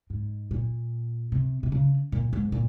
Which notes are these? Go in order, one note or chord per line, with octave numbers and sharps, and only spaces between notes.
G#2
A#2
C3
C3
C#3
A#2
G#2
A#2